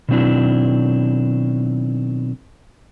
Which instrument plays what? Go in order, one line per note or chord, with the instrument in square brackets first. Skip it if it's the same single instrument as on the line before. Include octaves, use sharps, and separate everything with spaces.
[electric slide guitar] B2 D#3 F#3 C4 D4 E4